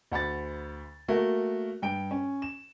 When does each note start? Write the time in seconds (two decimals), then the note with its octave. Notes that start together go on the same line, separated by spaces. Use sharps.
0.12 D2 F#5 B5 A6
1.08 A3 A#3 F#4 A#4
1.82 G2 G5 D7
2.11 C#4
2.42 E7